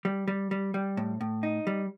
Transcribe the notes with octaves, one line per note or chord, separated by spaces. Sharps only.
G3
G3
G3
G3
A2
A2
D#4
G3